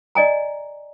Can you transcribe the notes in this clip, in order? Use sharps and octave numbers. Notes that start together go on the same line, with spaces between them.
D5 D#5 G#5 A#5